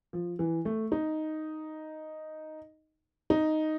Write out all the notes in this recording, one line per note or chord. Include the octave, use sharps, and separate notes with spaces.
F3
E3
A3
D#4
D#4